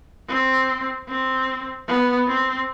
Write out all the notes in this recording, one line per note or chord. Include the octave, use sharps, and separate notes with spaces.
C4
C4
B3
C4